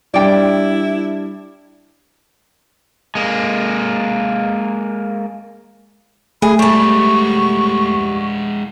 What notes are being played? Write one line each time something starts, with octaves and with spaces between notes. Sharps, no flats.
G3 D4 E4 D5 G5
G#3 A#3
A3 G#4 B5
G3 G#3 E4 A5 C#6